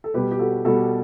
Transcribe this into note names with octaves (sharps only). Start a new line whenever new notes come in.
A4
B2 G3 G4 B4
G4
F#4 A4
B2 G3 F#4 A4